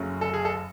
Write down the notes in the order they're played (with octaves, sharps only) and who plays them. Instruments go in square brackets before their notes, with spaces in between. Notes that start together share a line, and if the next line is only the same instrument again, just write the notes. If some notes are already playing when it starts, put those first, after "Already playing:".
Already playing: [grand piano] F#1 F#2 C#3 F#3 A3
A4
G#4
A4